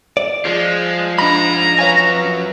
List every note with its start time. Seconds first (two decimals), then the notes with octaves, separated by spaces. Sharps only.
0.17 D5
0.45 F3 G#3 F4
1.19 G#3 D4 D#4 A#5 B5
1.79 F#2 B4 C#5 F5 G#5